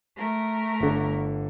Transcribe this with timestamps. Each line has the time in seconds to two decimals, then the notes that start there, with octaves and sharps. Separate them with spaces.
0.17 A3 A#4
0.80 G1 D3